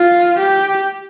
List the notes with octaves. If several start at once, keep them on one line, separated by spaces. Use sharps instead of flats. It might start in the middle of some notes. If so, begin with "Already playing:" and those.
Already playing: F4
G4